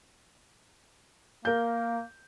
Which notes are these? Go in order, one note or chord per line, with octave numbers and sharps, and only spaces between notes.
A#3 A#4 G6